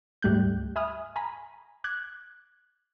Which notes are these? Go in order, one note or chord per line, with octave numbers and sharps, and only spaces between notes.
D2 G#2 G3 A3 F#6 G6
E5 G#5 B5 D#6 F6
G#5 A#5 B5
D6 F#6 G#6